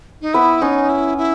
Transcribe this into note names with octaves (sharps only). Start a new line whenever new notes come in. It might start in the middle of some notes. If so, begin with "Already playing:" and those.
D#4
B3 E4 B4
C#4 D#4 C#5
E4
E4